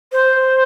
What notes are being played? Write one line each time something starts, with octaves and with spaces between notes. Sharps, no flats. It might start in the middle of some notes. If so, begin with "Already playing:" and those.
C5